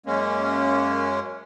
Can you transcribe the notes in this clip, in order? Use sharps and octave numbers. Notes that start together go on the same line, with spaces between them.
F#2 G#3 A#3 C#4